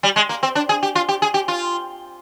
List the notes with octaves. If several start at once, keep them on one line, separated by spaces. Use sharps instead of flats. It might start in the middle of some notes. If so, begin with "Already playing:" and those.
G3
G#3
A#3
C4
D4
G#4
G4
F4
G4
G#4
G4
F4